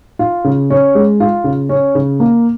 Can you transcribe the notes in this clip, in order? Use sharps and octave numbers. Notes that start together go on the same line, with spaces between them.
F4
C#3
C#4
G#3
F4
C#3
C#4
C#3
A#3